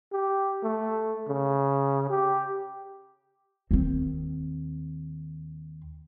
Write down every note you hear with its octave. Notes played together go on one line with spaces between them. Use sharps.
G4
A3
C#3
G4
D#2 C4